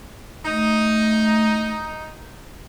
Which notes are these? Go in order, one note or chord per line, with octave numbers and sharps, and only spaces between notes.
A3 D#4